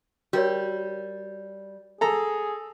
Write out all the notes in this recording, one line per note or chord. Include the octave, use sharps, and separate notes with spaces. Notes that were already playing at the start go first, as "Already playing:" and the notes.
G3 F#4 A#4 C#5
G#4 A4 A#5